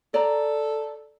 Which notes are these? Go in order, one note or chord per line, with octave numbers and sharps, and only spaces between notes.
A4 D5 A#5